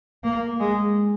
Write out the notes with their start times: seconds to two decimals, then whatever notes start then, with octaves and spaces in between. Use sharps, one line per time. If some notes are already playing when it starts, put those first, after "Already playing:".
0.23 A#3
0.60 G#3